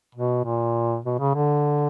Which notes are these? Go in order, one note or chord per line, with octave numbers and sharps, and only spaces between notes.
B2
A#2
B2
C#3
D3